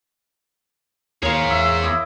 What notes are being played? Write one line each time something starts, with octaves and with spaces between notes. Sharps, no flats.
D#2 G#4 A#4 C5 C#5 F5
E2 E5
E4 D#5 D6